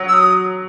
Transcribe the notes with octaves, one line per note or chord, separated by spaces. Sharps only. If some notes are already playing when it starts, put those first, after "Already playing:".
Already playing: F#3
E6
D#6